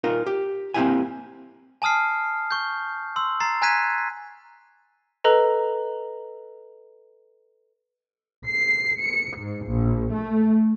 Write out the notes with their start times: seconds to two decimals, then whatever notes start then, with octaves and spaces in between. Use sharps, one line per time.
0.04 D#4 F4 A#4 F5
0.27 G4
0.74 A#3 C4 D#4 E4 G4 G#5
1.82 G#5 A5 D#6 F6 C7
2.51 C#6 G6
3.16 C6 E6
3.40 A#5 A6 C7
3.62 G#5 A#5 F#6 G#6 B6 D#7
5.24 A4 B4 D#5 A#5
8.46 C7
9.00 C#7
9.38 G#2
9.68 A#1
10.13 A3